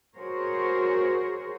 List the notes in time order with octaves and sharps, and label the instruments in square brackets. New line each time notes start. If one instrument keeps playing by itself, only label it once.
[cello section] F#4 G#4 A#4 C5 C#5